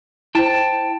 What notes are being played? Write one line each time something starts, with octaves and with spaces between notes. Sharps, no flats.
E4 C5 G5 A5